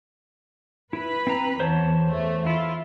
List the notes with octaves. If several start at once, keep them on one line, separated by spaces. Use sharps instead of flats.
E4 B4 B5
C4 A#5
E2 C5 C#5 A5
E2 A3
E4 F4